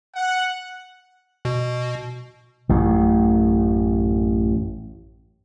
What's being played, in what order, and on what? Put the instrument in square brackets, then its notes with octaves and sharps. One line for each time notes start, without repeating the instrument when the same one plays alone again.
[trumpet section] F#5
[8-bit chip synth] B2
[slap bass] A1 F#2 A2